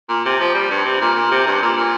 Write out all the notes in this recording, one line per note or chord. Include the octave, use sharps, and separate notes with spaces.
A#2
C3
F3
G3
G2
C3
A#2
A#2
C3
G2
A#2
A#2